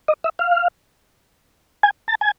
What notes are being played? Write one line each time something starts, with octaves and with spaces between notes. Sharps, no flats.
D#5
E5
F5
G#5
A5
G#5